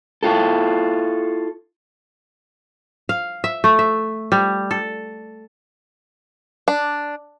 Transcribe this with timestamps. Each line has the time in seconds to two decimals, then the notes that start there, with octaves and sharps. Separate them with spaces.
0.23 E4 F4 A4
3.09 F5
3.44 E5
3.64 A3
3.79 E5
4.32 G3
4.71 A4
6.68 D4